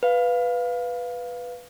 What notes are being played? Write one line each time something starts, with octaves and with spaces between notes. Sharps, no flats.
B4 F5